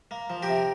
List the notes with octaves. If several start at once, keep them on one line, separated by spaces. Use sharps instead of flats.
A#3
F3
G4 A#4
C3